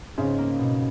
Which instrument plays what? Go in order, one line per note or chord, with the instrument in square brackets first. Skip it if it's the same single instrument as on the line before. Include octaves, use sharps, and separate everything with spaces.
[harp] G#2 [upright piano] C#3
[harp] A#3
B2